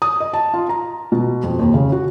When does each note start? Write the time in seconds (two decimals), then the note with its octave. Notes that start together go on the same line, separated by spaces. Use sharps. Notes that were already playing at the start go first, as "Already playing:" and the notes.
0.02 D#6
0.20 D#5
0.34 A5
0.54 F4
0.69 A#5
1.12 B2
1.44 F2
1.59 D#2
1.74 C#3
1.92 F#4